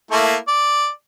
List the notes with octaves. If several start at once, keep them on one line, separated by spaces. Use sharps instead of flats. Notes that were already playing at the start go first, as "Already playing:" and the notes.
A3 A#3 E4
D5